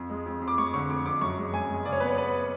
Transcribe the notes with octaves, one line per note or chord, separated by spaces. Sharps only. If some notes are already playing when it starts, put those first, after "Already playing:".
Already playing: F2
G#3
F2
F2
D6
G#3 C#6
D3 C#6
F2 D6
F2 D6
F#2 C#6
G#3
F#2 G#5
G#3
C#3 D5
C#5
B3 B4
C#5
B3 B4